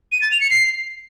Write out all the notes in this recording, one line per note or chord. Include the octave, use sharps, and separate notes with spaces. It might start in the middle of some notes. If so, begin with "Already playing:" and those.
D#7
A6
F7
C#7
C7